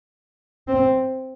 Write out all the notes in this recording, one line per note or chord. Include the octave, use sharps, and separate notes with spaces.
C4